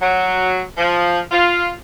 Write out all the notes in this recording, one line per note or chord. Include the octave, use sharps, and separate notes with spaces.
F#3
F3
F4